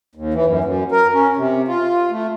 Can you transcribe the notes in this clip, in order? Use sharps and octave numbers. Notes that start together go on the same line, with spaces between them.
D#2
E3
F#2
F#2
A#4
C#4
C3
F4
A3